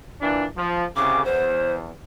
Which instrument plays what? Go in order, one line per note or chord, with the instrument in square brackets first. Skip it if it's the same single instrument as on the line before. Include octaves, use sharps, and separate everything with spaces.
[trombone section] A#2 E3 D4
F3
[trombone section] C2 C#3 [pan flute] D6
[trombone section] E2 [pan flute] C5